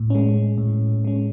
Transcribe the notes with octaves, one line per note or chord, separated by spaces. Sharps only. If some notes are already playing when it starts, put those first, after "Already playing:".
Already playing: A2
G#3 C#4
A2
G#3 C#4